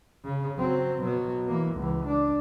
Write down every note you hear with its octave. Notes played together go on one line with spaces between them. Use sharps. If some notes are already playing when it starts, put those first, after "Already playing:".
C#3
F#3 C4
B2 F#3
E3 A#3
C#2 E3
D4